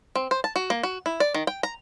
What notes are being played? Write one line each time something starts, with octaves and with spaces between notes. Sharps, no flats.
C4
C5
A5
F#4
A#3
F#4
E4
D5
D#3
G5
A#5